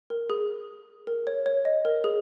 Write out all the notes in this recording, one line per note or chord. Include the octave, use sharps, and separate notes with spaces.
A#4
G#4
A#4
C#5
C#5
D#5
A#4
G#4